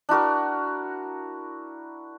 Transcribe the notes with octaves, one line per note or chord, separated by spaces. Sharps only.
D4 E4 F#4 A#4